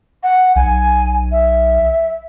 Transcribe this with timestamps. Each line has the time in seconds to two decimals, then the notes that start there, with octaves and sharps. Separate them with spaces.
0.23 F#5
0.56 B1 G#5
1.32 E5